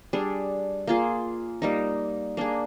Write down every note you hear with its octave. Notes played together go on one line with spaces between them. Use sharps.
G3 D4 G#4
A#3 F4 G#4
G3 A#3 D#4
A#3 D4 G#4